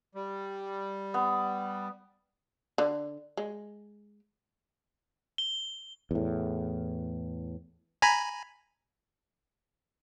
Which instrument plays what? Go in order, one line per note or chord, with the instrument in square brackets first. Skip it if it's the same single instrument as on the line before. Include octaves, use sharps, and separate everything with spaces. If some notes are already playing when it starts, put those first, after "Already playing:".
[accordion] G3
[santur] B3
[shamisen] D3
G#3
[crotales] G7
[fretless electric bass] E2 A2
[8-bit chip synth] G#5 A#5 B5